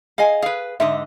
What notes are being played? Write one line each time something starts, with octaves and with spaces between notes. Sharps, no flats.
G#4 D#5 F5 G#5
G#4 B4 F5
G#2 D3 D#5 E5